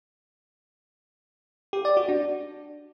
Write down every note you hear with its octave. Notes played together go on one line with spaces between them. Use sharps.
G4
D5
F#4
D4